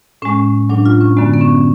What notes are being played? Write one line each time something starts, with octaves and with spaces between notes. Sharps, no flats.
A2 G#3 C#4
A2 F#3 D4
F4
C#4
F#2 D3 G#3 B3
B3
C#4